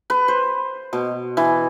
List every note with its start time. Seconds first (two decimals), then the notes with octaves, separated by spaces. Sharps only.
0.10 B4
0.28 C5
0.93 B2
1.37 E3